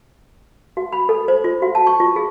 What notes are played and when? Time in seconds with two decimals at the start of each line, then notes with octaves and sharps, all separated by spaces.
0.77 F#4
0.93 B5
1.09 A4
1.28 C5
1.44 F4
1.62 F#4
1.75 A5
1.87 C#6
2.00 F4
2.16 G#4